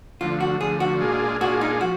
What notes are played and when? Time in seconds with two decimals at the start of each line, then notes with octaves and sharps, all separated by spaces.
0.21 D2 D3 F3 F4
0.40 F#4
0.61 D2 D3 F3 G#4
0.80 F#4
1.01 A#2 G#3 D4 F4 G#4
1.41 A#2 G#3 D4 F4 F#4 G#4
1.61 D#4
1.81 F3 F#4